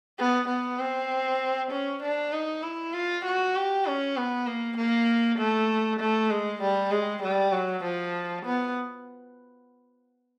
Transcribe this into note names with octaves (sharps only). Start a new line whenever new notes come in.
B3
B3
C4
C#4
D4
D#4
E4
F4
F#4
G4
C#4
B3
A#3
A#3
A3
A3
G#3
G3
G#3
G3
F#3
F3
B3